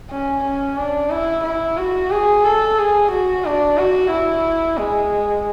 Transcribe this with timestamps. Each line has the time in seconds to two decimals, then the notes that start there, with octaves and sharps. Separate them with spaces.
0.10 C#4
0.44 C#4
0.78 D4
1.10 E4
1.44 E4
1.77 F#4
2.11 G#4
2.44 A4
2.78 G#4
3.11 F#4
3.45 D4
3.78 F#4
4.11 E4
4.78 G#3